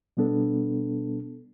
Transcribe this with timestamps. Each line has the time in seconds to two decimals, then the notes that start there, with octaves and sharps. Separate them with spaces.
0.17 B2 G3 B3 D4 A4